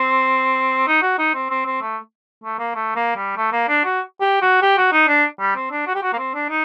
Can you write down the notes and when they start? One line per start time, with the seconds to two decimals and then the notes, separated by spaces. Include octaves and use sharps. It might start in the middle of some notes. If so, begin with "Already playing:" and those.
Already playing: C4
0.88 D#4
1.02 F#4
1.18 D#4
1.35 C4
1.50 C4
1.66 C4
1.81 A3
2.44 A3
2.59 A#3
2.75 A3
2.96 A#3
3.16 G3
3.37 A3
3.52 A#3
3.68 D4
3.84 F#4
4.21 G4
4.42 F#4
4.62 G4
4.78 F#4
4.93 D#4
5.08 D4
5.40 G3
5.56 C4
5.71 D4
5.87 F#4
5.95 G4
6.03 F#4
6.13 A#3
6.18 C4
6.34 D4
6.49 D#4